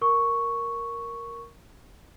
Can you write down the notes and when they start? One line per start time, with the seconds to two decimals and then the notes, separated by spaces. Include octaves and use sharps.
0.01 A#4 C#6